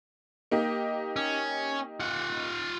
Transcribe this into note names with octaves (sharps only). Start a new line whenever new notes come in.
A#3 D#4 G4
C#4
F4 F#5